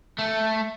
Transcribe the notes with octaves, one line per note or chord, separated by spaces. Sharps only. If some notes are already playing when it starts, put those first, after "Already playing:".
A3